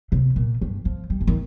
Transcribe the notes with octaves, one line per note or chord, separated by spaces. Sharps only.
C3
A#2
G2
F3
G3
D3
D#3